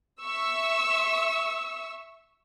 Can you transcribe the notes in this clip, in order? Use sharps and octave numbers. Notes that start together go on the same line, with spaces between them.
E5 C#6 E6